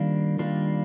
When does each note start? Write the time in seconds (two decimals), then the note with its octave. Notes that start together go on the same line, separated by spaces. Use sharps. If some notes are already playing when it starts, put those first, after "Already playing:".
Already playing: D#3 G3 A#3 D4 F4
0.39 D#3 G3 A#3 D4 F4